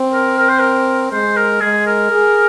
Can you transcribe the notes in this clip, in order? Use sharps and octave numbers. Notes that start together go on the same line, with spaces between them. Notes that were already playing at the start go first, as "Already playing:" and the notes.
Already playing: C4
A#4
A#4
C5
A#4
G#3 C5
A#4
G#3 G#4
A#4
G#4